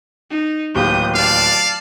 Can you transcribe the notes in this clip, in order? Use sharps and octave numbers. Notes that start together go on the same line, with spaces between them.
D#4
D1 D#2 G4 D#6 G6
D5 F5 A5